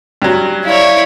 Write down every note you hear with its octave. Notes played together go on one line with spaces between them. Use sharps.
G2 F#3
E4 C#5 D5 F5